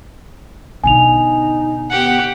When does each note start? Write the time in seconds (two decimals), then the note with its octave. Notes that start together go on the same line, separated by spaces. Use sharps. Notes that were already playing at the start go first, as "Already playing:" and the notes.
0.84 B2 D3 D#4 G#5 F7
1.90 B3 G4 F#5